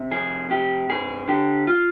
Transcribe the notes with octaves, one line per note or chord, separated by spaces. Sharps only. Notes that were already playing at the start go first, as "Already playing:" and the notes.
Already playing: C3
F2 G#4
C3 G4
G2 G#4
D3 G4
F4